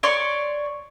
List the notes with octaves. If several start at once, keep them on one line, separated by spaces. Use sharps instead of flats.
C#5 D5 C6 C#6